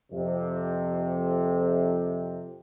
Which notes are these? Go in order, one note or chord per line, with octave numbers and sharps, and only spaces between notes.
F2 C3